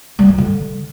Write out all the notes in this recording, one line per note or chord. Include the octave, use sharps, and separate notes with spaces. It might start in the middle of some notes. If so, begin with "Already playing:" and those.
G3
F4
D3